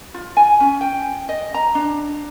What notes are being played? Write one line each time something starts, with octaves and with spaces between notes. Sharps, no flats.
F4
G#5
C#4
G5
D#5
A#5
D4